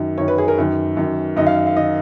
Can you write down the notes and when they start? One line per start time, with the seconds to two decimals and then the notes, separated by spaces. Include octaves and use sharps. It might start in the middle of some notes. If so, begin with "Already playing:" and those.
Already playing: F#2 D#3
0.18 F#2 D#3 C#5
0.28 B4
0.38 G#4
0.48 A#4
0.58 F#2 D#3
0.97 F#2 D#3
1.36 F#2 D#5
1.40 D#3
1.46 F5
1.67 F5
1.76 D#3 D#5